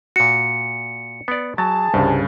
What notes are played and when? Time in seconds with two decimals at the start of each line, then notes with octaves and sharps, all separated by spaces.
0.16 A#2 F#4 C#7
1.28 B3 D5
1.58 F#3 G#4 A5 A6
1.94 C2 G2 C#3